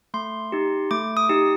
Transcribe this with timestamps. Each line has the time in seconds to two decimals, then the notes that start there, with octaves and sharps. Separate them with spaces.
0.14 A3 C6
0.52 D#4 G4
0.91 A3 D6
1.17 D#6
1.29 D#4 G4